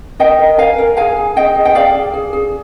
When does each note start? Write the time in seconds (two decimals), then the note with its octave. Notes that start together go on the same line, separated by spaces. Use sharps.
0.19 A#4 D#5 G5
0.39 A#4
0.58 A#4 F5 G#5
0.78 A#4
0.97 G#4 F5 G#5
1.17 G#4
1.36 G#4 D#5 G5
1.55 G#4
1.65 G5
1.75 G#4 D5 F5
1.95 G#4
2.13 G#4
2.33 G#4